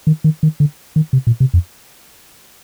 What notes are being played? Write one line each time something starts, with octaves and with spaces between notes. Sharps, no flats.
D#3
D#3
D#3
D3
D#3
C3
A#2
C3
F2